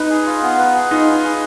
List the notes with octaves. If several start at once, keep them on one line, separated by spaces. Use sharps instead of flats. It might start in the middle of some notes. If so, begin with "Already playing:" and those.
Already playing: D#4 B4
G#4
F4
B3
B4
G#4
D#4 F4
B4
G#4